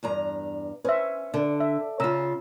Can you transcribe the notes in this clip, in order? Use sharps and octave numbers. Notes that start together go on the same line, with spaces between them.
E2 G2 A#5
C#4 B4 C5 E5
D3
E5
C#3 F4 A#5 E6